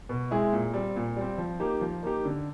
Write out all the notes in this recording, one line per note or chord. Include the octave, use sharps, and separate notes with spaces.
B2
G#3 C4 E4 G#4
A#2
G3 C4
A#2
G3 C4
F3
A#3 D#4 G4
F3
A#3 D#4 G4
D3